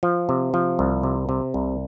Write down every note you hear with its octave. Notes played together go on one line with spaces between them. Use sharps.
F3
C3
F3
C2
C3
C3
C2